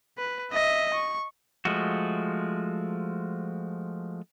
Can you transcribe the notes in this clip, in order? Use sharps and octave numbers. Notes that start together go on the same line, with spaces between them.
B4
D#5 E5
C#6
F3 G#3 A3 F#4